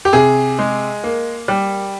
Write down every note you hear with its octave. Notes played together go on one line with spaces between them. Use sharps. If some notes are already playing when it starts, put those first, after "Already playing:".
G4
C3 G#4
G#3
A#3
G3